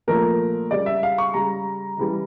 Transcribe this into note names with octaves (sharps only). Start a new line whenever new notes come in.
A#2 F3 A3 A#4
C#3 G3 D5
E5
F5
C#6
C#3 G3 A#5
C#3 E3 G3